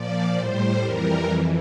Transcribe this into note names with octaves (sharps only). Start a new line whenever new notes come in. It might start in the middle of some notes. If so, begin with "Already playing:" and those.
Already playing: A#2 F3 D5
A2 G3 C5
F2 E3 G3 A#4
F2 E3